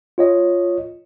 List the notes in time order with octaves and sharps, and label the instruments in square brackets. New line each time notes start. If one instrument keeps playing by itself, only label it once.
[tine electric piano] F4 C#5 D#5